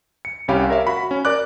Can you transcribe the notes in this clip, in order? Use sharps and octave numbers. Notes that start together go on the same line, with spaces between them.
C#7
C2 C#4 G4 F5 B5
A#4 C#5 E5 F5
F#4 B5
C#4
A#4 D5 D6 F#6